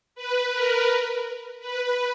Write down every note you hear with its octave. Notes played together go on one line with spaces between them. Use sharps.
B4
A#4
B4